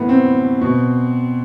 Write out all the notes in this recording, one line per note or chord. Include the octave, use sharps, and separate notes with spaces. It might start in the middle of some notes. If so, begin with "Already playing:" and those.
Already playing: A2 E3 A3 B3
C4
B2